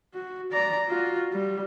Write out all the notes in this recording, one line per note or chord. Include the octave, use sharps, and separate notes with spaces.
F#4
D5 A#5
F4 F#4
G3